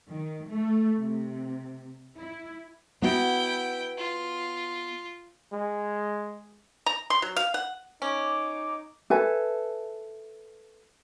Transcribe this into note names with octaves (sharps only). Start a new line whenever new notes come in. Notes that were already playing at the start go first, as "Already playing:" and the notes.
D#3
A3
C3
E4
B3 E4 F#4 G5
F4
G#3
A#5
C6
F#3
F5
F#5
C#4 D#4 D6
A4 B4 E5 G#5